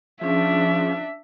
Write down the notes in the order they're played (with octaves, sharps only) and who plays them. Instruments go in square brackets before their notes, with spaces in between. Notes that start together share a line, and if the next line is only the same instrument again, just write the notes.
[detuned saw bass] F3 [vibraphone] C#4 G#4 [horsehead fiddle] D4 E5